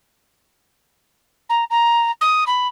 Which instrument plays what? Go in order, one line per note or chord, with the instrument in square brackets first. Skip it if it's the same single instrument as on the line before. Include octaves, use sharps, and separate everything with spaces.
[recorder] A#5
A#5
D#6
B5